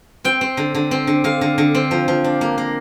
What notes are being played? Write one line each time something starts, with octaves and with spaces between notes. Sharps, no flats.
C4 G5
C4
D3
D3
C4
D3
D3 F5
D3
D3
C4
F3
F3
D4
A#3
A#3